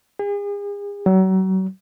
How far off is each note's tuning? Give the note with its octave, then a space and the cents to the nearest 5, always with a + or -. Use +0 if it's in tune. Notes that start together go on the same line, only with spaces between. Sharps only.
G#4 -40
F#3 +35